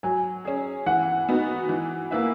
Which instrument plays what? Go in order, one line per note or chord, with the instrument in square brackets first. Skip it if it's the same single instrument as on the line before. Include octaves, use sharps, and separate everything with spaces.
[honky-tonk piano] F#3 [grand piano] G#5
[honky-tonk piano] C#4 G#4
[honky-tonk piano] E3 [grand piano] F#5
[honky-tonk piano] B3 D#4 F#4
E3
A#3 E4 B4 E5